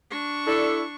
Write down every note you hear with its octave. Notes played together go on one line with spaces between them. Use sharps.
D4 C#6
E4 A4 D5